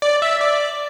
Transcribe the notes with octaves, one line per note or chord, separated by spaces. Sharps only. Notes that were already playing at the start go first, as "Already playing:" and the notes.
D5
E5
D5